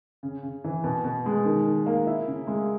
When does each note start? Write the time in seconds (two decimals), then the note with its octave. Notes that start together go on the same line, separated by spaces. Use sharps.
0.23 C#3
0.43 C#3
0.64 E3
0.84 B2
1.04 B2
1.26 G#3
1.45 D#3
1.66 D#3
1.86 A#3
2.07 E4
2.27 C#3
2.47 G#3